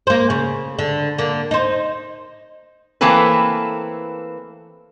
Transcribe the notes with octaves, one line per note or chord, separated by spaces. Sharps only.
A#3 C5
C#3
D3
D3 A#3
D#4 C5
E3 A3 A#3 C4 A4 B4